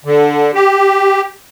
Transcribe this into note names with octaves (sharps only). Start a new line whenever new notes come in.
D3
G4